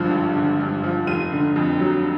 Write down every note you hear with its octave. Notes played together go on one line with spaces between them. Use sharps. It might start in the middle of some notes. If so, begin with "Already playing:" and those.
Already playing: G#1 G2 D3 F3
G#1
D3
G2
F3
F1 D#7
D3
F2
F#3